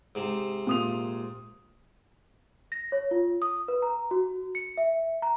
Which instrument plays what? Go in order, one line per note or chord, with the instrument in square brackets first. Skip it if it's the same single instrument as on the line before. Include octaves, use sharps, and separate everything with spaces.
[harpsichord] G#2 C3
[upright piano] A#2 D#6 F7
[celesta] A#6
C#5
F4
D#6
B4
A#5
F#4
C#7
E5
A#5